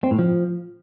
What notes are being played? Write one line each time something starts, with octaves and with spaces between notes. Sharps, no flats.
C4
A2
F3